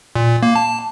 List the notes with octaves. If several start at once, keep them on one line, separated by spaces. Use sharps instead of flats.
A#2
A#3
A5